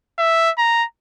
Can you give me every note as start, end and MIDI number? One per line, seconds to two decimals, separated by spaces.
0.19 0.50 76
0.58 0.85 82